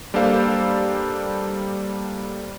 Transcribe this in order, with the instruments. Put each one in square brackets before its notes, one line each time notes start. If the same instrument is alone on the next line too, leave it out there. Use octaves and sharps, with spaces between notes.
[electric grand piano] G3 A#3 D4 A4 C5 F5